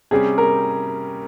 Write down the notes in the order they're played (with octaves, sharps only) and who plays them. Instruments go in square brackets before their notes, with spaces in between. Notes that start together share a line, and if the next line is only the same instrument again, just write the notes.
[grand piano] C3 G3 C#4 G4 [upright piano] G#4
[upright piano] A#4